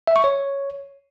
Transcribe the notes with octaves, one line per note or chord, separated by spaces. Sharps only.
E5
C#6
C#5